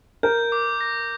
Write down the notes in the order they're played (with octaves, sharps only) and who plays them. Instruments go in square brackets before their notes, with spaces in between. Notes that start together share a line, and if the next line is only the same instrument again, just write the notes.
[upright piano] A#4 [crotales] G6
[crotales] D6
A#6